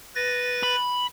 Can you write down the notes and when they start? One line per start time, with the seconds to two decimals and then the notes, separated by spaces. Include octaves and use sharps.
0.15 B4 A6 A#6
0.63 B5